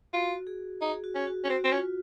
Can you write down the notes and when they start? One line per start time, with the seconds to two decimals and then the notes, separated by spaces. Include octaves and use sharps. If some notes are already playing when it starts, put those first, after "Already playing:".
0.13 F4 F#4
0.47 G#4
0.81 D#4 G#4
1.04 F#4
1.15 C#4
1.27 F#4
1.44 C#4
1.49 C4 F#4
1.64 C4
1.72 C#4 F4